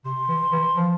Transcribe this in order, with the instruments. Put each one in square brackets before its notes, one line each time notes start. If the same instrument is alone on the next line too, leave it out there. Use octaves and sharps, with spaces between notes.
[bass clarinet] C3 [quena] C6
[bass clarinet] E3
E3
F3